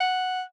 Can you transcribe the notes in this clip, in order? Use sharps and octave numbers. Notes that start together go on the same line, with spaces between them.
F#5